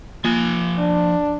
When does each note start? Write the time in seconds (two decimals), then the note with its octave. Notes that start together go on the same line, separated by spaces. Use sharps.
0.24 F3 A#3 F4 G#5
0.78 D4